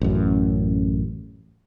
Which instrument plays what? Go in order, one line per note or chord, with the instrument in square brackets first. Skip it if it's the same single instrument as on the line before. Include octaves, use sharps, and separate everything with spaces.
[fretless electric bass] A1 F#2